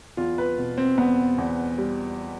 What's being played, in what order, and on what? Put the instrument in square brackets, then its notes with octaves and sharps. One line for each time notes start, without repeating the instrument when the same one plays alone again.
[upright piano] E2 F4
B4
B2
C4
E2 B3
E2
G3